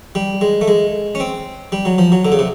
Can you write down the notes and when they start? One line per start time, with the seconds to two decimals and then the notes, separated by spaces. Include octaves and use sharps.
0.15 G3
0.41 G#3
0.61 A3
0.68 G#3
1.15 C#4
1.20 C4
1.72 G3
1.85 F#3
1.98 F3
2.12 F#3
2.25 D3
2.32 C#3
2.39 C3